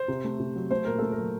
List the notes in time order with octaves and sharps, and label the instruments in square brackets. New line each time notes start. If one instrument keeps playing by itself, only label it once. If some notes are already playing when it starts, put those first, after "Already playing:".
Already playing: [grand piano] C5
C3
A3
C3
F#3
A3 C5
A#2 A#4
A3 A4
A#4
F#3